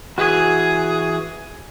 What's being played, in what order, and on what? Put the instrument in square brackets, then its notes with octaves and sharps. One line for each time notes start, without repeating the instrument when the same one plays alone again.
[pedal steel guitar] E3 F#4 [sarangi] G#4